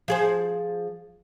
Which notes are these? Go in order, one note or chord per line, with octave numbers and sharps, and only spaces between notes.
F3 G#4 C5